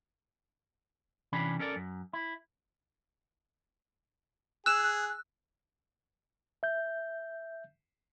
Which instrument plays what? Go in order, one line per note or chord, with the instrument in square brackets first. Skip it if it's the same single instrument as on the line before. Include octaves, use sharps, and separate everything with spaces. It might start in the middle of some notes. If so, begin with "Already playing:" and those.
[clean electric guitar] C3 E3 C#4 D4 B5
C#4 A4 A#4 D5
F#2
E4
[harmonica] G#4 [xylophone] E6 E7 [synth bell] F#6
[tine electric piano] E5 G6